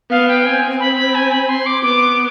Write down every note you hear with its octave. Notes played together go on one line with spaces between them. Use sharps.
B3 F5
G5
C4 G#5
B5
B5
G#5
B5
C6
D6
B3 D6